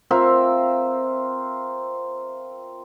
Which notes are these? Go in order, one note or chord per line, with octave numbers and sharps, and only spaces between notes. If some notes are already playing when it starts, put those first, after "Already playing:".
C4 F4 A#4 E5